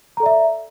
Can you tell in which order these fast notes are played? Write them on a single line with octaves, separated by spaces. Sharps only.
A#5 A4 D5 E5